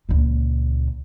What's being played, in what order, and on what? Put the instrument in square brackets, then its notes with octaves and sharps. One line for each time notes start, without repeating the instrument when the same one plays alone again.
[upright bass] C#2 A#2